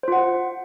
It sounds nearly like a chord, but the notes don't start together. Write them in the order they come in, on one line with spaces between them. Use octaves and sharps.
C5 F4 F#5